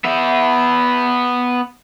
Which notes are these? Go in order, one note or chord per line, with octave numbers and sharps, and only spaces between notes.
B3 E5